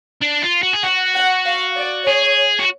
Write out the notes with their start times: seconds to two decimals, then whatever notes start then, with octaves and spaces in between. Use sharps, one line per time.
0.22 D4
0.43 F4
0.63 F#4
0.74 G#4
0.83 F#4 F#5
1.15 F#5
1.46 F5
1.76 D5
2.07 G#4 C#5
2.60 F#4